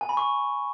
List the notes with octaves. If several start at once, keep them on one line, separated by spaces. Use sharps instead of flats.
G#5
B5
C#6